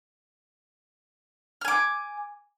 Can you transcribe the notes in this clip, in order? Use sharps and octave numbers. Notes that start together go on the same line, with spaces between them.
G#5 D6 F6